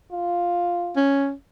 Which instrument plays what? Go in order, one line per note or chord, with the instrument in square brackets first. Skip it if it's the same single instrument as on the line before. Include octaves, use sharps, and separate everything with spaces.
[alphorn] F4
[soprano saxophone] C#4